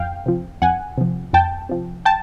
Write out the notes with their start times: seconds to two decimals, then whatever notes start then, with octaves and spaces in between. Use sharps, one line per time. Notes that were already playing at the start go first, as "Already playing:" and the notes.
Already playing: F2 F5 G5
0.26 C3 F3
0.62 F2 F#5 G#5
0.98 C3 F3
1.33 F2 G5 A5
1.69 C3 F3
2.05 G5 A5